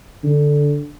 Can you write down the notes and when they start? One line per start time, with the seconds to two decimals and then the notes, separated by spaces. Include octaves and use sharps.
0.24 D3